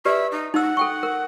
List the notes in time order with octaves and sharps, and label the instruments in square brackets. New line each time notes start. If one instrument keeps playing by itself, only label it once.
[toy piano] G4 B4 D5 [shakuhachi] E5
[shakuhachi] D#4
[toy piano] D#4 E6 [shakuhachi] F#5
[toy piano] A4 G5 C#6
A#4